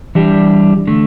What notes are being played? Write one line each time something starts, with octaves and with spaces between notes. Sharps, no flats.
E3 G3 D4 G4
D3 A3